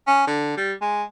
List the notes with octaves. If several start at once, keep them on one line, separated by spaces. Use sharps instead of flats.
C#4
D3
G3
G#3